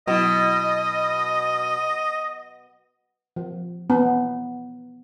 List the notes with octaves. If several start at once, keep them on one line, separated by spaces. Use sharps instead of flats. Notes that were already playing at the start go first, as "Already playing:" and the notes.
B2 F#3 E4 D#5
F3
B3